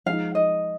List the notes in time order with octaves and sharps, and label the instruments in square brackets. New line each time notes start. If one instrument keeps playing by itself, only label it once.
[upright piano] F3 G#3 D#4 [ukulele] F5
[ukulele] D#5